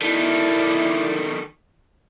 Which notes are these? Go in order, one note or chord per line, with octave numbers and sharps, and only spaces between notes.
D#3 A3 E4 D5